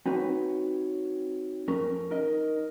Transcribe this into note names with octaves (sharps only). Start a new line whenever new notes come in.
C4 D#4 F#4 B4 C#5
F2 C#4 A#4
D#4 A#4 D#5